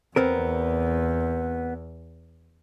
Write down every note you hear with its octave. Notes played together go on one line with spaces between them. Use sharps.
E2 B3 C4 A#4